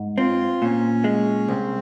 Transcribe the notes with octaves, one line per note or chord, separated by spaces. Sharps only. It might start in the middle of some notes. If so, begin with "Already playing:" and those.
Already playing: G#2
C4 F4
A#2 C#4
G#3
C2 C4